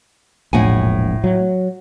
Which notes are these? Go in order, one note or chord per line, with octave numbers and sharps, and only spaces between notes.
E1 A#1 A2 F#5 G#5
F#3